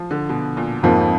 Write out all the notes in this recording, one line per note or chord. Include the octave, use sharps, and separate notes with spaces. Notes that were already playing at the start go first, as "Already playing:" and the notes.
Already playing: F3
D3
B2
A#2
F2 G#2 F3 A#3